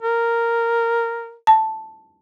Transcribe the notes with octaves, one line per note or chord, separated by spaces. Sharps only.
A#4
A5